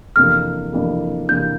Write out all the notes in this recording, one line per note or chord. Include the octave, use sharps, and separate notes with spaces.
F2 C3 E3 A#3 D4 F6
F2 C3 E3 A#3 D4
C3 E3 A#3 D4 G6